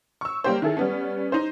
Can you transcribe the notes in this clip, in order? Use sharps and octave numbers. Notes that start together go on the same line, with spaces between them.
C#6 E6
G3 A#3 G4 C5
D#3 E4 G#4 A4
G3 B3 C#4
D#4 C5